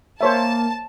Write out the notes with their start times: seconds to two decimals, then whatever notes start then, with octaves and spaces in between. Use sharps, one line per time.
0.21 A#3 C5 C#5 E5 A5